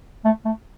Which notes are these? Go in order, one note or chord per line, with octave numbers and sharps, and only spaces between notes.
A3
A3